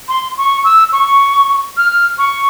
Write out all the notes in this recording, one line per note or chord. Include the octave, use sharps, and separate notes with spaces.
C6
C#6
E6
C#6
F6
C#6